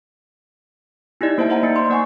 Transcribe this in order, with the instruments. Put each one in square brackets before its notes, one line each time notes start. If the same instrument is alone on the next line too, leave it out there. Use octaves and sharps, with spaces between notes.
[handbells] D#4 E4 G4 D5 D#5
A#3 C5 E5 A5
C5 D#5 F#5 A5 A#5
A#3 D#4 C#7
D5 C6
A#3 D5 F#5 G#5 C#6 C7